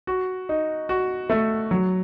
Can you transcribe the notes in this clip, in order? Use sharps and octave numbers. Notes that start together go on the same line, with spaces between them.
F#4
D#4
F#4
A3
F#3